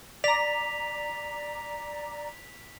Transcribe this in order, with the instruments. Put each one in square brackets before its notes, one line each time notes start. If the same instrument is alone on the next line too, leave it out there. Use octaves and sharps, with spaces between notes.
[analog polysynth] D5 A#5 [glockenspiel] B6 F7